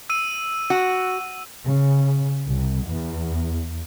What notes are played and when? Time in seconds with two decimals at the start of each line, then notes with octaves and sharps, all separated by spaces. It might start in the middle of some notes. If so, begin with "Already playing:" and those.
0.10 E6 D#7
0.70 F#4
1.65 C#3
2.46 C2
2.86 E2